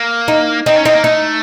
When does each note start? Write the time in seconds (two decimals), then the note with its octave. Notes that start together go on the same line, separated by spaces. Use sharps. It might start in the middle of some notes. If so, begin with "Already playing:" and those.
Already playing: A#3
0.28 D#4
0.66 C4 D#4
0.76 C#4
0.85 C4 D#4
0.94 A#3
1.03 A3 D#4